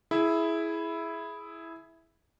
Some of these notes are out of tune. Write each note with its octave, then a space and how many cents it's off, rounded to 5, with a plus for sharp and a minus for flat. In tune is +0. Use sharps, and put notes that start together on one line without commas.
E4 +0 G#4 +15 E5 +0